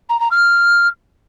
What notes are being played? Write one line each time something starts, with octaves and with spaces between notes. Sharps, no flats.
A#5
A#5
F6